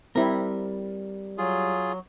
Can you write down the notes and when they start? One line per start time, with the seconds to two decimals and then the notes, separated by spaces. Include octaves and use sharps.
0.16 G3 C4 E4 A#4
1.38 F#3 F4 G#4